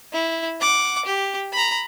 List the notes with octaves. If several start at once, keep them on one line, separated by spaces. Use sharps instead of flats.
E4
F#5 D6
G4
A#5 B5